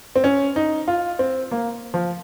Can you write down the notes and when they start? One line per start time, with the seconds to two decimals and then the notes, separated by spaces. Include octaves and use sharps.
0.16 C4
0.24 C#4
0.56 D#4
0.88 F4
1.19 C4
1.51 A#3
1.94 F3